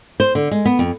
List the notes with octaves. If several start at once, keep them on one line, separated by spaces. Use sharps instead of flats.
C5
D3
G#3
B3
F2